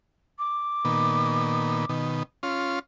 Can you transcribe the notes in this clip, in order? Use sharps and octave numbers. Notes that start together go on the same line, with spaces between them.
D6
A#2 D#3 B3
B2 D#3
C#4 F4 C6